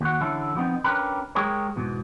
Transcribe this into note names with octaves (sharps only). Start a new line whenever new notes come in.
D#2 F#4
D3 E3 C#4 E4 A4
F3 G3 B3 C4 D#4
C#4 D4 G4 A#4 B4
G#3 G4 G#4 A#4 C#5
E2 G#2 B2